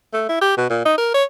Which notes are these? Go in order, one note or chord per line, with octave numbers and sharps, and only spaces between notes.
A3
E4
G4
B2
A#2
D#4
A#4
C#5